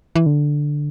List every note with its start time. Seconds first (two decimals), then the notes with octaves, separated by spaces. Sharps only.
0.16 E3
0.26 D3